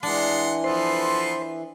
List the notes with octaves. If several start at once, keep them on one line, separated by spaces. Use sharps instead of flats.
E3 G#3 D4 F#5 C6
F3 B3 A4 C5 C6